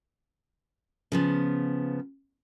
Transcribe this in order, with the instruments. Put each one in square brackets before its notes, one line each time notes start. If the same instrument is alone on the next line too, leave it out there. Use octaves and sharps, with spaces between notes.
[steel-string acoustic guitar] C#3 F3 B3